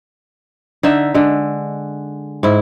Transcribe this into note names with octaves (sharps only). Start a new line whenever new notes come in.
D3 D#4 E5
D3 G#3
G#2 E4